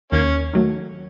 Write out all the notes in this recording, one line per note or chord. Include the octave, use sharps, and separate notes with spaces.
D#2 A#3 C#4
D#3 F#3 A3